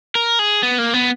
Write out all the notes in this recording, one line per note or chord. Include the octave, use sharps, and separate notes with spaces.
A#4
G#4
B3
A#3
B3